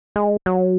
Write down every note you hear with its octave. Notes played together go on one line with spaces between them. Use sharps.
G#3
F#3